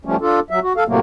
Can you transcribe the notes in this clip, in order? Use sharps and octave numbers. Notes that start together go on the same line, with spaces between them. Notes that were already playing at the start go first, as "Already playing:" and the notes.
F3 G3 A3 C#4
D4 F4 A4
F#3 E5
F#4
A4 F5
A2 C3 F#3 A3 A#3